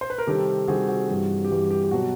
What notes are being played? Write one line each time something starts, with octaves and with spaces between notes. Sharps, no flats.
C5
B4
A#4
C3 D#3 G3 C4 G4 A4
C3 D#3 G3 C4 F#4 G#4
F#4
G2 E3 G3
G4
G2 E3 G3 F#4
G4
G4
B2 F#3 F#4